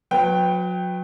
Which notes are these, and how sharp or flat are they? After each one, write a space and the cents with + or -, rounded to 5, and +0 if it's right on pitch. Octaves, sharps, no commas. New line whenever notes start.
F#3 -35 B4 +15 G5 +0